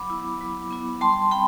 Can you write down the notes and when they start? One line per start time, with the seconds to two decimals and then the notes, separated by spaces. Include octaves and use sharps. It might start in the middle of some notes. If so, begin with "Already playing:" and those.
Already playing: F#3 B5 D6
0.10 B3 E4
0.41 F#3
0.71 B3 E4
1.01 G3 A5 C6
1.31 C4 G5 B5